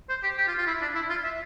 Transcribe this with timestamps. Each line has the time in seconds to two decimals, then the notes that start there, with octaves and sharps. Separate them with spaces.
0.09 C5
0.23 G4
0.37 G4
0.47 F4
0.58 F4
0.67 E4
0.82 D4
0.95 E4
1.09 F4
1.24 E5